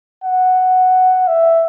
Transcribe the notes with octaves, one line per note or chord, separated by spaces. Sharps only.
F#5
E5